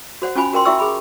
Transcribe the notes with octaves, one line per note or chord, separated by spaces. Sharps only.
F#4 C5 F#5
C#4 F4 F#4 G#5 B5
F#4 A#4 G5 C6
E4 F#4 E5 G5 C#6 E6
G#4 B5